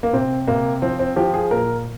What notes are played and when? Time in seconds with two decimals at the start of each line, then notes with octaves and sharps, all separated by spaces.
0.03 A#3
0.13 C3 C4
0.47 C3 A#3
0.82 F3 C4
0.99 C4
1.16 F3 G4
1.34 G#4
1.51 A#2 A#4